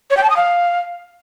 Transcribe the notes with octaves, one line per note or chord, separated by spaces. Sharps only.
C#5
G5
A5
D#6
F5